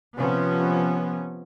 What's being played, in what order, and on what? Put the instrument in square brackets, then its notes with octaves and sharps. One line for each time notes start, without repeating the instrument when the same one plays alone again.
[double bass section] C3 F3 B3 C#4